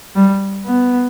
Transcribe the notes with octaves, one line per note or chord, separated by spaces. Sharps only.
G3
B3